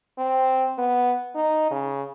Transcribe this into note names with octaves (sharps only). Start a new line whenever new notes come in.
C4
B3
D#4
C#3